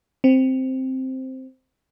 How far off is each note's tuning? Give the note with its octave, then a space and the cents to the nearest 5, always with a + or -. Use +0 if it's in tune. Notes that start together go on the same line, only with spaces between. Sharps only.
C4 +0